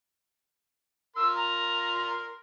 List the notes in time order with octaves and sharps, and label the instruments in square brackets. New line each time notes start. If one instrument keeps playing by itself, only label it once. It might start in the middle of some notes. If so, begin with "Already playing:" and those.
[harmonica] A#4 C6 [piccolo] E6
[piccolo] A#5